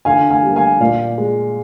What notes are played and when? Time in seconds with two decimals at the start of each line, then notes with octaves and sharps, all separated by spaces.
0.05 D3 F5 G#5
0.30 F5 G#5
0.43 G3 A#3
0.56 F5 G#5
0.80 A#2 D5 F5
1.18 G#3